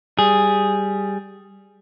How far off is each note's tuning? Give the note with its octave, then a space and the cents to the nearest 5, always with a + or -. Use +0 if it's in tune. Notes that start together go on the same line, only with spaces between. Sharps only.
G3 +0 G#4 +0